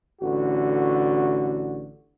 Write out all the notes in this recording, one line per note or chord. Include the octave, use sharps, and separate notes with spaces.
A1 D3 F#4